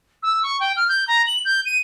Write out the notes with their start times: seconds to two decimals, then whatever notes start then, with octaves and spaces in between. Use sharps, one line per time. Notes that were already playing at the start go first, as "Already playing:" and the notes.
0.23 E6
0.43 C#6
0.60 G5
0.76 F6
0.89 G6
1.08 A#5
1.27 F#7
1.45 G6
1.65 D#7